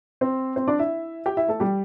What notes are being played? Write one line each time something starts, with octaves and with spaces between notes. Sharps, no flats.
C4 C5
C4 C5
D4 D5
E4 E5
G4 G5
E4 E5
A3 A4
G3 G4